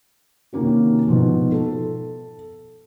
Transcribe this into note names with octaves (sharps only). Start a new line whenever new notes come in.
C3 D#3 A#3 C#4 F#4
G#2 B2 F3
A4